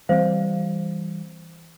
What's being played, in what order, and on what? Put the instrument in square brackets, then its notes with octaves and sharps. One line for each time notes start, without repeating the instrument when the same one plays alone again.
[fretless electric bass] E3 G3 C4 [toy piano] C5 F5